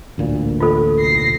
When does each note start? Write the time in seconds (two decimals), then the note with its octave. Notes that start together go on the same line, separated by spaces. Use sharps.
0.18 A1 D2 A#2
0.60 F4 A4
1.00 B1 A#6 C7